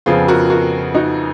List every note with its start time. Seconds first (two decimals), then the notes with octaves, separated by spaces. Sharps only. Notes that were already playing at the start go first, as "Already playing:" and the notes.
0.06 F2 C#3 F3 B3 F4 G#4
0.28 F#4 A#4
0.50 F#4 A#4
0.95 D#4 F#4